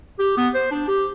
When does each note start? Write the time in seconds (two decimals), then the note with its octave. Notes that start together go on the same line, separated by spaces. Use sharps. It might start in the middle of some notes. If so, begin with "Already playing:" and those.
0.19 G4
0.37 B3
0.54 C5
0.71 D4
0.88 G4